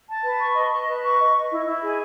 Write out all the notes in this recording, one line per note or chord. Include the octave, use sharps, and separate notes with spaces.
A5
B4
C#6
D#5
A5
B4
C#6
D#5
D#5
E4
E4
G#4